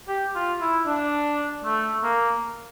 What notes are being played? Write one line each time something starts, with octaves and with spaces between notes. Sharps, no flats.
G4
F4
E4
D4
A3
A#3